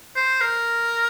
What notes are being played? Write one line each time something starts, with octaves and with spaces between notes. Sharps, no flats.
C5
A#4